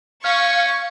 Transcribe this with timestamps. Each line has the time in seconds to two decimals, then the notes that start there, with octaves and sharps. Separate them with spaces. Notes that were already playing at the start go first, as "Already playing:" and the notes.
0.24 C#4 F5 C#6